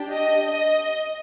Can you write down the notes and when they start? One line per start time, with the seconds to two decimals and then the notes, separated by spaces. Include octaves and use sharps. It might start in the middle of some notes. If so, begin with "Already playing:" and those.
Already playing: D4 G4
0.12 D#5
0.53 D#5